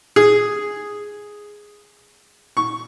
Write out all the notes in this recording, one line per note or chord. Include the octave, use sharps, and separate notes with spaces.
G#4
C#6